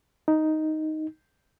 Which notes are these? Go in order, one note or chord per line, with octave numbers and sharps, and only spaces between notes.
D#4